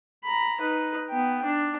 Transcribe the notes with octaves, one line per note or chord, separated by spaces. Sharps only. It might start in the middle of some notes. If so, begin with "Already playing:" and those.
A#5 B5
D#4 B4
B3 G5
D4